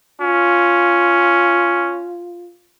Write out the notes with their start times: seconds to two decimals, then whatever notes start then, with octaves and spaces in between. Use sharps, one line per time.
0.22 C#4 F4